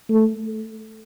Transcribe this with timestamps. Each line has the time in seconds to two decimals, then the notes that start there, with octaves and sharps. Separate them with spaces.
0.10 A3